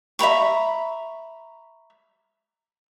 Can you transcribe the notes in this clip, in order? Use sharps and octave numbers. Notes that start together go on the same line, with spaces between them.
E5 A#5 B5 C#6